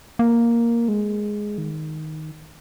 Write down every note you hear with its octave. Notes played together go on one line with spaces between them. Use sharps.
A#3
G#3
D#3